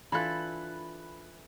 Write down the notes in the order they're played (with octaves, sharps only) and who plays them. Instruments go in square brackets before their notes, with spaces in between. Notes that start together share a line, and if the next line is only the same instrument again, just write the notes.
[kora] E3 A4 [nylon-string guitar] D4 F4 [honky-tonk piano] B5 F#6